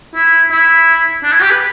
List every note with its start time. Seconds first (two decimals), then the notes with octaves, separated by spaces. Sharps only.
0.15 E4
0.51 E4
1.24 D4
1.32 E4
1.41 G4
1.51 B4